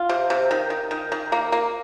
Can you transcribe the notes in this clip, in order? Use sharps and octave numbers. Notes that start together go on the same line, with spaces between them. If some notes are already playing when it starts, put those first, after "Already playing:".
Already playing: F4
C3
C3
D#3
D#3
D#3
D#3
A#3
A#3